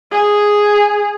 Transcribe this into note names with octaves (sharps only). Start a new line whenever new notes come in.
G#4